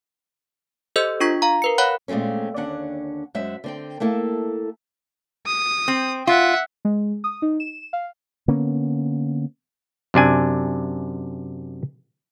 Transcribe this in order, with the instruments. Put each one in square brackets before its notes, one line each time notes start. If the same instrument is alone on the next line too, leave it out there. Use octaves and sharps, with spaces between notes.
[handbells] G4 A4 C5 D#5 E6 G6
D4 F4 C#6 G#6 B6
F5 A#5
A#4 B4 C#7
C#5 F5 F#5 B5 F#6
[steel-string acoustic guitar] A#2 G#3 A3 C4 C#4
D#2 D3 C#4 D4 F#5
F#2 G#3 C5 E5 F#5
D3 C4 G5
A3 A#3 E4 A4
[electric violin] D#6
[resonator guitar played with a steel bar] C4
[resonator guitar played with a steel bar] F4 [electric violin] E5 F#5
[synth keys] G#3
D#6
D#4
E7
F5
[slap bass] D3 A#3 B3 C#4
[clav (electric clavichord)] F#2 C3 D4 G#5